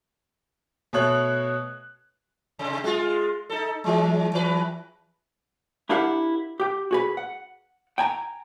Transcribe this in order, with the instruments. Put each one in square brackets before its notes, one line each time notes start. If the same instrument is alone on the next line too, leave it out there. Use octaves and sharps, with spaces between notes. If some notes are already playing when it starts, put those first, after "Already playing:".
[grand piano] B2 A3 C#5 F#6
[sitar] C3
G#3 F4
D#4 A4
E3 G#3
E3 B4
[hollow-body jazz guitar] D4 E4 G4 A#4 F5 F#5
G4 G5
F#4 G#4 B4
F#5
G5 G#5 A#5